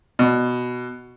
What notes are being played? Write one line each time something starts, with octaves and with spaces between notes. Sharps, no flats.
B2